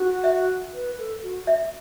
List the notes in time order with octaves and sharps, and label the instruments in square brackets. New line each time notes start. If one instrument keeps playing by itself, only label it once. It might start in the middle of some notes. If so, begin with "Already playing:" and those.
Already playing: [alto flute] F#4
[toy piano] E5
[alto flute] B4
A4
F#4
[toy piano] E5